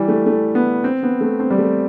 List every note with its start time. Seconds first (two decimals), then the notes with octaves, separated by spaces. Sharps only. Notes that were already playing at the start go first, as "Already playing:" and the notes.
Already playing: E3 G3
0.08 A3
0.26 A3
0.55 B3
0.84 C4
1.03 B3
1.21 A3
1.40 C4
1.51 G3
1.59 A3